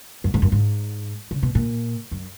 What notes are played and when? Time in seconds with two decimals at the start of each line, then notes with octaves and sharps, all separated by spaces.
0.24 F#2
0.34 G#2
0.42 F#2
0.52 G#2
1.31 C#3
1.43 B2
1.55 A#2
2.11 F#2